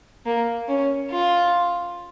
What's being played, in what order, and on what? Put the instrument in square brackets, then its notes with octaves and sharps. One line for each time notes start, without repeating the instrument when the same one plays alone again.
[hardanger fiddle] A#3
C#4
F4